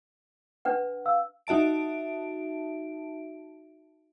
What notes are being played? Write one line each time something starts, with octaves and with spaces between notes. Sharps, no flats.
D4 B4 F#5
F5 E6
D#4 F#4 E5 A5 D7